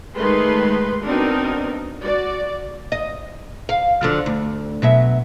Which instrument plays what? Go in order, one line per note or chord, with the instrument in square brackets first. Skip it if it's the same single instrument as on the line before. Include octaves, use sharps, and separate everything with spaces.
[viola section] D#3 G#3 A3 B4 C6
B3 C4 D4 D#4 F#4 A#4
F#4 D5
[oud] D#5
F5
D3 F3 F#3
D2
B2 F#3 E5